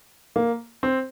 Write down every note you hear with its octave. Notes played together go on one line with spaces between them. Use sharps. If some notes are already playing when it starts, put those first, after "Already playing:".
A#3
C4